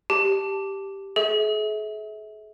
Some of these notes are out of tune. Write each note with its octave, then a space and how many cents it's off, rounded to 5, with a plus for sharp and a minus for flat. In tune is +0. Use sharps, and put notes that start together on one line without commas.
G4 +0 A5 +0
G#4 +45 E5 -30